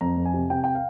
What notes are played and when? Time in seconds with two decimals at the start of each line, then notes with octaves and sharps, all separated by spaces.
0.01 F2 A#5
0.17 F2
0.26 G#5
0.34 C3
0.50 C3 G5
0.64 G5
0.75 F5